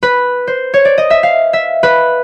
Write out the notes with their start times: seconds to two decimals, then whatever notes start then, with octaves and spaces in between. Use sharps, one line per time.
0.03 B4
0.47 C5
0.74 C#5
0.85 D5
0.98 D#5
1.10 E5
1.23 F5
1.53 E5
1.83 B4